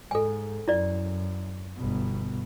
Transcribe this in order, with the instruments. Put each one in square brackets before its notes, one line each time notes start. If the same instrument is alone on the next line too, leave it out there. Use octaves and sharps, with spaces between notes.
[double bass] G#2 [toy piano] A4 G#5
[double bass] F#2 [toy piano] E4 D5
[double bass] G1 B2